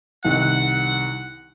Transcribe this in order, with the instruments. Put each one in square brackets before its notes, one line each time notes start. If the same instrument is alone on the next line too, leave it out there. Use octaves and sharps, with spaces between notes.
[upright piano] C2 D#3 [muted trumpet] F#5